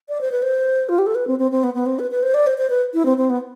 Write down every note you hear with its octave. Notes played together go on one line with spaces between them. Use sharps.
D5
C5
B4
C5
F4
G4
A4
B4
C4
C4
C4
B3
B3
C4
B4
B4
C5
D5
C5
C5
B4
E4
C4
C4
B3